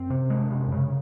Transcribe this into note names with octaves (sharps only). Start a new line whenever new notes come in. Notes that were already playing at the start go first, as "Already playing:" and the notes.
Already playing: F#2 C4
C3
G#3
C3
F2
F#2 C#3